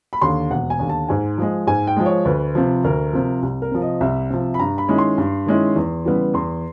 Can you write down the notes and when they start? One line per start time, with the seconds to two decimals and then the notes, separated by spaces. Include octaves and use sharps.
0.13 B5
0.21 D#2 D3 C6
0.50 E1 F#5
0.70 G#5
0.79 D#2 D3
0.89 A5
1.09 G#2 G#5
1.38 F3 G#3
1.67 G#2 G#5
1.87 G5
1.97 F3 G#3
2.06 C#5
2.25 D2 B4
2.55 C3 F3
2.84 D2 A#4
3.13 C3 F3
3.43 C2
3.62 A#4
3.72 C3 F3
3.82 D#5
4.01 C2 E5
4.30 C3 F3
4.54 B5
4.59 G2 A#5
4.78 B5
4.88 D#3 G#3 C#4 E4
4.98 C6
5.18 G2
5.46 D#3 G#3 C#4 E4
5.76 E2
6.05 C#3 E3 G3 B3
6.34 E2 C6